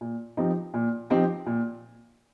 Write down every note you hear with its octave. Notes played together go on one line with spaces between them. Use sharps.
A#2
F3 C4 D#4 G4
A#2
F3 C4 D#4 G4
A#2